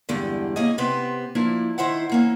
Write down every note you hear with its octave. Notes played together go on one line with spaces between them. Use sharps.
E2 G2 D3 G#3 G4
A#3 C#4 G#4 D#5
C3 B3 C4 G4
F3 A#3 D4 E4
D#3 E4 C5 E5 F#5
E3 A#3 C#4